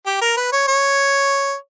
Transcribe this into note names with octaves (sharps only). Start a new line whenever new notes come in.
G4
A#4
B4
C#5
C#5